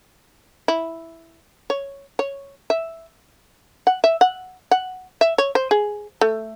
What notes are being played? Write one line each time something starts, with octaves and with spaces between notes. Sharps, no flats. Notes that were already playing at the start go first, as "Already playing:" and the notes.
E4
C#5
C#5
E5
F#5
E5
F#5
F#5
E5
C#5
C5
G#4
A3